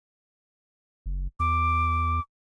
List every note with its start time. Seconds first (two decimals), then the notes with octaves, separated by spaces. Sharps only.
1.06 F#1
1.40 E2 D6